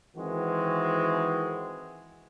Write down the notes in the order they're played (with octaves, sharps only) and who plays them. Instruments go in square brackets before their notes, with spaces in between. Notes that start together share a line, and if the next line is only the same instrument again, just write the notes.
[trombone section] D#3 E3 G#3 C4 F#4